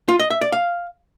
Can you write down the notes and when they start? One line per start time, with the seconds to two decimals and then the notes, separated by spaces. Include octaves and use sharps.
0.08 F4
0.19 D#5
0.30 E5
0.41 D5
0.52 F5